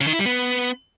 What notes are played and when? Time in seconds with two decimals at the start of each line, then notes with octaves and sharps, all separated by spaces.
0.01 C#3
0.07 D#3
0.13 E4
0.19 G3
0.25 B3